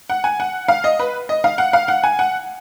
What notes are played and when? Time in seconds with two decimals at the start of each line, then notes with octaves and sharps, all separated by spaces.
0.10 F#5
0.24 G#5
0.40 F#5
0.68 F5
0.84 D#5
0.99 B4
1.29 D#5
1.44 F5
1.58 F#5
1.73 F5
1.88 F#5
2.04 G#5
2.19 F#5